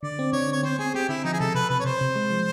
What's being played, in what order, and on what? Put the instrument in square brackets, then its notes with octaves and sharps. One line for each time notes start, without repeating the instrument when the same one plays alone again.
[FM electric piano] D3 [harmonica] D5
[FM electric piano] C4
[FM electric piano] D3 [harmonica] C#5
[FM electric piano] C4 [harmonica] C#5
[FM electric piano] C4 [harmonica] C5
[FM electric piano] C4 [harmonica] G#4
[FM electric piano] C4 [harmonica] G4
[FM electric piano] D3 [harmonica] E4
[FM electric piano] F3 [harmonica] D#4
[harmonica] G#4
[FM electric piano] C3 [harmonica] A4
[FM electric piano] C3 [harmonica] B4
[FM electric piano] C3 [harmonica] B4
[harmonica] C#5
[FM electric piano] C3 [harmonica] C5
[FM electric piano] C3
G#3
F3